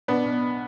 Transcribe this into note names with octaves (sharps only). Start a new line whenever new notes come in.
B2 B3 D4
B1